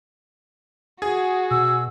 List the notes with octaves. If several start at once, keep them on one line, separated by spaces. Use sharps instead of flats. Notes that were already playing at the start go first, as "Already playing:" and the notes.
F#4 G#4
B2 E6